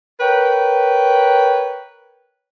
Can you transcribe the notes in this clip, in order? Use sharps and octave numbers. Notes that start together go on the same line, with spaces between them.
A#4 B4 C#5 G5